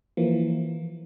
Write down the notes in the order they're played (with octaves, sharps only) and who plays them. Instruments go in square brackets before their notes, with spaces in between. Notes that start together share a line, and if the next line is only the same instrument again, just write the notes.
[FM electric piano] E3 F3 A#3